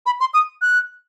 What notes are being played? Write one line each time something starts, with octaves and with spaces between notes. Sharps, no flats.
B5
C6
D#6
F#6